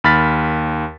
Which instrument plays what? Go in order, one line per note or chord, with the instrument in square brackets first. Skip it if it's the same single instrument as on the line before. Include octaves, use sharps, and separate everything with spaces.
[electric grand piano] D#2 B5 F6 A6 B6